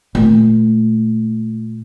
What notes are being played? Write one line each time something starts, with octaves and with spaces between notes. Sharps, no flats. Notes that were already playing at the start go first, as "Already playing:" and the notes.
A#2 A3